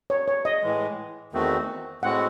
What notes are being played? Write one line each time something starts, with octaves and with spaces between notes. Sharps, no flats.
C#5
C#5
D#5
A2 E3 G#3
E2 D#3 A3 C4 F#4
A2 G#3 C4 F#4 F#5